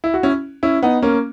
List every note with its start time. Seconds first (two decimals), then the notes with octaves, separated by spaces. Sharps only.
0.04 E4
0.14 F#4
0.23 C#4 E4
0.63 C#4 E4
0.83 B3 D#4
1.02 A#3 C#4